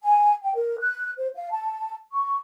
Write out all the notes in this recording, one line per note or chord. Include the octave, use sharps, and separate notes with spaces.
G#5
G5
A#4
F#6
C5
F5
A5
C#6